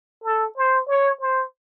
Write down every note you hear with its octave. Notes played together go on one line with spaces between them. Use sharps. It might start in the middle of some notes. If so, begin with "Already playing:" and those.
A4
C5
C#5
C5